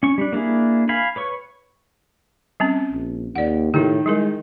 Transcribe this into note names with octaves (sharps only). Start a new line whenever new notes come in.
C#4 C#6
G3 D4
A#3 D4 E4 G#4
F5 G#5 B5
B4 C#5 C#6
G3 C4 C#4
A#1
D#2 D5 F#5
A2 D#3 E4 G4
G3 G#3 E4 A#4